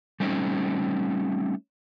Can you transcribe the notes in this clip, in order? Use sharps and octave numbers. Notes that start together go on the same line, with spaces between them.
G3 A3 C4 C#4 D#4